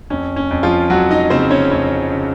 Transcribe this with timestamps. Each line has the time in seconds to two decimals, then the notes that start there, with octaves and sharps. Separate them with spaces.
0.10 F2 C#4
0.36 C#4
0.51 F2
0.63 F3 F4
0.90 F2 F#3 F#4
1.10 D#4 D#5
1.30 C#3 C4 C5
1.50 C#4 C#5
1.71 F2 C#4 C#5
2.11 C#3